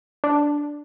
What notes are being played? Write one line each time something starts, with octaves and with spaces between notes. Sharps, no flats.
D4